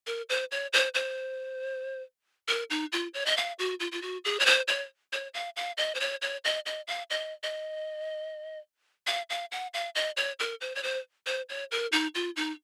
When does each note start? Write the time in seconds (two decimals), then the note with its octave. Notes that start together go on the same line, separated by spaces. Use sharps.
0.07 A#4
0.29 C5
0.52 C#5
0.73 C5
0.94 C5
2.48 A#4
2.70 D#4
2.92 F4
3.14 C#5
3.26 D#5
3.37 F5
3.59 F#4
3.80 F4
3.92 F4
4.02 F#4
4.25 G#4
4.40 C#5
4.46 C5
4.68 C#5
5.13 C#5
5.34 F5
5.56 F5
5.77 D#5
5.95 C5
6.00 C#5
6.22 C#5
6.45 D#5
6.66 D#5
6.87 F5
7.10 D#5
7.43 D#5
9.07 F5
9.30 F5
9.52 F#5
9.74 F5
9.95 D#5
10.17 C#5
10.39 A#4
10.61 C5
10.75 C#5
10.83 C5
11.26 C5
11.49 C#5
11.71 A#4
11.92 D#4
12.15 F4
12.36 D#4